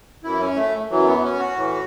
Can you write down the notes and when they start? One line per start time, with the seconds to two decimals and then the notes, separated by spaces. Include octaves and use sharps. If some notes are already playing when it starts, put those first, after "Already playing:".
0.23 F#2 E3 E4
0.40 C#4
0.56 A3
0.90 F#2 E3 F#3
1.07 B3
1.23 C#4
1.39 F#4
1.56 A2 E3